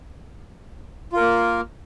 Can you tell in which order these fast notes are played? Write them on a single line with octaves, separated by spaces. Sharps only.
F4 A#4 A#3